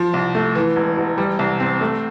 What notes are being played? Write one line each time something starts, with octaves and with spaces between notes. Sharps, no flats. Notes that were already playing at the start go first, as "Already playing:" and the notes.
Already playing: F3
C2
A3
E3
E1
E1
G3
C2
C4
A3